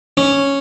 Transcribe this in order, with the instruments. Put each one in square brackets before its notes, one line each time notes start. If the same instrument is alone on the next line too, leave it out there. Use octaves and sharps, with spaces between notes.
[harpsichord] C#4